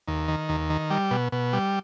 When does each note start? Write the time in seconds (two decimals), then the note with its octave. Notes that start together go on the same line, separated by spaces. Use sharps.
0.08 D#2
0.28 D#3
0.49 D#2
0.70 D#3
0.90 G3
1.11 B2
1.32 B2
1.53 G3